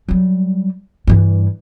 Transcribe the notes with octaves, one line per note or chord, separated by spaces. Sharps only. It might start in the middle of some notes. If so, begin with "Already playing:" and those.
F#3 G3
G2 E3